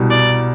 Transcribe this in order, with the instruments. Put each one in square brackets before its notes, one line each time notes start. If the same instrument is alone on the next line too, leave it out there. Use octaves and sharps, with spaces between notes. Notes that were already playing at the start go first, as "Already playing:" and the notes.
Already playing: [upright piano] C2 B2 G3
[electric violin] D5